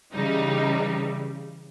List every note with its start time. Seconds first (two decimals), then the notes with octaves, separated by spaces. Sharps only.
0.14 C#3 E3 G3 D#4